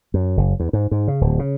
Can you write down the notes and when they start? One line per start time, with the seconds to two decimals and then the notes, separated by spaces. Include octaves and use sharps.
0.14 F#2
0.37 F#1
0.60 E2
0.73 G#2
0.91 G#2
1.08 C#3
1.21 D1
1.39 C#3